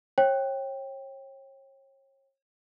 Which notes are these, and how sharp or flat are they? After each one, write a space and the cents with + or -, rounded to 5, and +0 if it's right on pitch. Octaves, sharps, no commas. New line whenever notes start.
C#5 -35 G5 +0